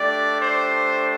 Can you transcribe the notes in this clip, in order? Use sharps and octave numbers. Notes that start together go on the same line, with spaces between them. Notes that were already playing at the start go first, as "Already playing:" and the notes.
Already playing: A3 D4 G4 D5
C5